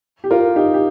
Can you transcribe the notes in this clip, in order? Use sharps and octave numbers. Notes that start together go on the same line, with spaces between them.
G4
F4 A#4
D#4 G4
G4